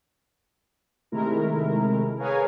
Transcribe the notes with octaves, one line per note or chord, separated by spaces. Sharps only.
C3 D#3 G#3 A3 E4 A#4
G#4 A#4 B4 C#5 F5 G#5